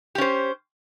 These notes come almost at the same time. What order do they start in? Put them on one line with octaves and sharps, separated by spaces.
G4 C#4 C5